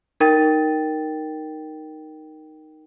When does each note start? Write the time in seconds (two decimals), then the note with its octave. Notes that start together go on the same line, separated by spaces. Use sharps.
0.20 D#4 A#4 G5 A6